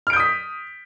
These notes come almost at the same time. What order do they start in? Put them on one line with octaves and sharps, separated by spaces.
F6 D7 G6 D#6 B6